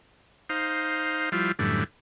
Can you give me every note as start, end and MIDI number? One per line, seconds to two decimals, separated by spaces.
0.50 1.29 63
0.50 1.29 72
0.50 1.29 77
1.32 1.52 53
1.32 1.52 55
1.32 1.52 64
1.32 1.52 65
1.59 1.84 42
1.59 1.84 45
1.59 1.84 50
1.59 1.84 52
1.59 1.84 55